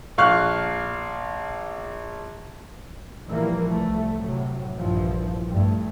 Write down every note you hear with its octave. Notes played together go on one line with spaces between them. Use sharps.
A#1 F5 C#6 F6 F#6
A#1 E3 F3 G3 A#3
C2 A3
A2 C3 F#3
A#1 G2 E3 F3
G2 A3